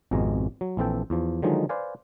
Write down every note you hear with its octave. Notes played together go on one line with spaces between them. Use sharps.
G#1 F2 B2 G#3 A#5
F#3
A#1 E3 C4 A4 G5
E2 F3
D3 D#3 F3 F#3 G#3 D#4
B4 C5 D5 F5 G#5